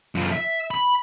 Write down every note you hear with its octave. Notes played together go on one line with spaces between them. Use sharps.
F#2 F4
E5
B5